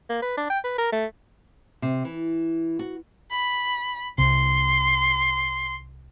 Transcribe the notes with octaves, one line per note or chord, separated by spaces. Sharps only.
A#3
B4
D4
G5
B4
A#4
A3
C3
E3
F#4
B5
C2 C3 C6